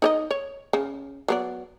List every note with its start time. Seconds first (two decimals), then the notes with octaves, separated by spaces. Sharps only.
0.02 D#4 C#5 D#5
0.31 C#5
0.73 C#3
1.28 F#3 B3 D5